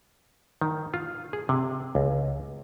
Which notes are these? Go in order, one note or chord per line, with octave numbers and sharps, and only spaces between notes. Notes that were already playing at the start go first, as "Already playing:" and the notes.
D#3
F4
G#4
C3
C#2